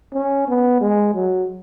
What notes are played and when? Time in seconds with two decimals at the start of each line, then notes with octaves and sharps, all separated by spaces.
0.14 C#4
0.48 B3
0.81 G#3
1.15 F#3